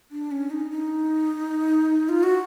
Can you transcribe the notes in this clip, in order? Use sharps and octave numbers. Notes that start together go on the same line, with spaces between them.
D4
C#4
D#4
D#4
F4
F#4